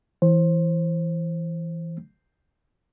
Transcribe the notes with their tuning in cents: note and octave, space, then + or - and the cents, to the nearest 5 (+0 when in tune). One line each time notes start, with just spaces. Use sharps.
E3 +0 C5 +20